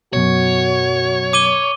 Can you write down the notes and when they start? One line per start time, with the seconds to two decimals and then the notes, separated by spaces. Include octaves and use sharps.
0.13 F#2 B2 F#4 C#5
1.33 D6 D#7 G7